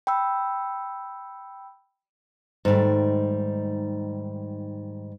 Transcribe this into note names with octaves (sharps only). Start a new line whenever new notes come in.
G5 B5 E6
G#2 D#3 G3 A3